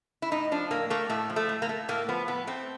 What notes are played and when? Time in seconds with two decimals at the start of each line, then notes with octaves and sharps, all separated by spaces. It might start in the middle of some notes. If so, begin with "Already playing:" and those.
0.22 E4
0.31 A2 D#4
0.52 F3 D4
0.71 A2 A#3
0.90 A3 A#3
1.10 A2 A3
1.30 F3
1.36 A3
1.49 A2
1.62 A#3
1.69 A3
1.88 A2 A#3
2.08 F3 B3
2.28 A2 B3
2.47 A3 C4